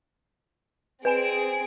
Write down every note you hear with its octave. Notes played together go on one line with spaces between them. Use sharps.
C4 G#4 B4 G#5 D7 E7